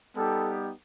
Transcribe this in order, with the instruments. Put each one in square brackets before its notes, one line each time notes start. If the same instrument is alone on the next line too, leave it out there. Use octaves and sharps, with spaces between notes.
[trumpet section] G3 B3 D#4 G4 A4